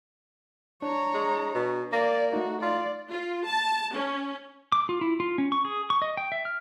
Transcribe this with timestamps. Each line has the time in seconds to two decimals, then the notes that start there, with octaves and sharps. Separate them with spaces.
0.82 D4 C#5 A#5
1.14 G#3
1.55 B2
1.93 A#3 D5
2.33 A3 D#4 F#4
2.62 F4 D5
3.09 F4
3.46 A5
3.94 C#4
4.72 D6
4.89 F4
5.01 E4
5.20 F4
5.38 C#4
5.52 C#6
5.65 G#4
5.90 C#6
6.02 D#5
6.17 G5
6.32 E5
6.45 F6